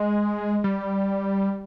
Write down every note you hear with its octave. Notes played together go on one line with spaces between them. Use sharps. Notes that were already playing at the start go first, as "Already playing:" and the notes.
Already playing: G#3
G3